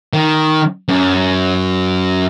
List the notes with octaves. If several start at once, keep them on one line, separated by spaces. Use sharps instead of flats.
D#3
F#2